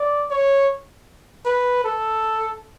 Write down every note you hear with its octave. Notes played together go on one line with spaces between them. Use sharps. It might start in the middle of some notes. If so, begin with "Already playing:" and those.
Already playing: D5
C#5
B4
A4